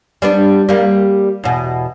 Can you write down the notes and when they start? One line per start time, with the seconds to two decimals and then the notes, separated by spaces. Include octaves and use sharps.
0.22 G3 B3 D4
0.69 G3 A#3
1.44 E2 B2